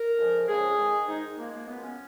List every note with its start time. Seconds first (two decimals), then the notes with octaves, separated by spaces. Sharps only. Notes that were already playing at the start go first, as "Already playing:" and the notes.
Already playing: A#4
0.18 F2 C#3 F3 G#3
0.48 F2 C#3 F3 G#3 G#4
0.78 G#2 D#3 G#3
1.08 G#2 D#3 G#3 D#4
1.38 F#2 F3 G#3 A#3
1.53 A#3
1.67 F#2 F3 G#3 B3
1.83 C#4